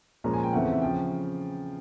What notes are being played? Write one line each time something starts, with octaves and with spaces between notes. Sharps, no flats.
A#2 F3 G#3 C#4 A#5
G#5
G5
E2 C#3 E3 A3 C4 F#5
E5
C#3 F3 G5